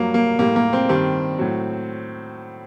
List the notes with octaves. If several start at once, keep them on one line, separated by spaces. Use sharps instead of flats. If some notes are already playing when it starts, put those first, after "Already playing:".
Already playing: G2 F#3 A#3
A#3
A2 G3 A#3
A#3
C4
G2 D#3 G3 C4
A2 F#3